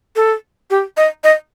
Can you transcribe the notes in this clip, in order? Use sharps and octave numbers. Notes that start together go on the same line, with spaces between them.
A4
G4
D#5
D#5